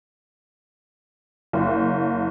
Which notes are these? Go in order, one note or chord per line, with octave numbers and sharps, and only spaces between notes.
F#1